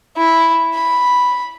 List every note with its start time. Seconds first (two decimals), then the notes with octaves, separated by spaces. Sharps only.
0.17 E4
0.75 B5